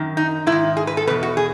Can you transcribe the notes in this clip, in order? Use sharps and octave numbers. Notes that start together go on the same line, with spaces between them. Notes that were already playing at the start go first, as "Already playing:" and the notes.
Already playing: F#2 D#3
D#4
G#2 E4
D#3
G#4
B4
A4
E2 B2 B4
F#4
G#4